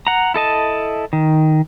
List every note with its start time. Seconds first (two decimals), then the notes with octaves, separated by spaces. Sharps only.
0.07 F#5 A#5
0.34 E4 A4 D#5 A5
1.13 D#3